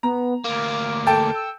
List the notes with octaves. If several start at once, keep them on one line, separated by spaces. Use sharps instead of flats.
B3 A#5
D2 A#3 D6
A4 G5 A5
E6